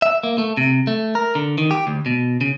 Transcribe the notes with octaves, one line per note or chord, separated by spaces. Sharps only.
E5
A#3
A3
C3
A3
A#4
D3
D#3
G4
D2
B2
C#3